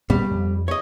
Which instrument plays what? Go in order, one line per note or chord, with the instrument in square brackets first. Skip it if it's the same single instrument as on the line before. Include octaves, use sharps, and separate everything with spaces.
[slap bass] A#2 B3 C#4 [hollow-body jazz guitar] G3
[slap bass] F2
[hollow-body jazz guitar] C#5 D#5